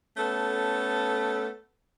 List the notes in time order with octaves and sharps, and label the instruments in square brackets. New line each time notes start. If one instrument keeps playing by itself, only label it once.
[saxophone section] A3 B3 C#4 A4